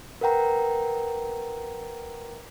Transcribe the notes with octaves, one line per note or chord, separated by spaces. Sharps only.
A#4 B4 F#5 G5 A#5